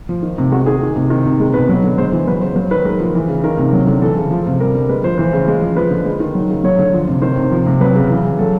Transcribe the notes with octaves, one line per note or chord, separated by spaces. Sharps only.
F3
D#3
C3
G#3 F#4
D#3 G#4
D#3
C3
D#3
C3
G#3
B2 B4
F#3
D3
G#3 C5
E3
F#3 B4
C#3 C5
F#3 C5
D#3 B4
G#3 A#4
F3
E3
C#3
D#3 A#4
C3
F#3
D3
E3 A4
C#3
F3
C3
G3 A#4
D3
G#3 B4
F3 C5
E3 C5
C#3
G#3
F3
F3 B4
D3
G#3
D#3
F#3
C#3
F#3 C#5
D3
F3
C3
D#3 C5
C3
F3
C3
F#3 B4
C#3
E3
C#3
F#3 A4